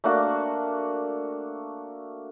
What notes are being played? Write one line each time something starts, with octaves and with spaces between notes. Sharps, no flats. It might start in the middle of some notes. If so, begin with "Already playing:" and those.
A3 A#3 D4 F#4